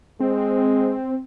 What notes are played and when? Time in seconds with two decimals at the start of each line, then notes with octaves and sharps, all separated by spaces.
0.20 G#3 C4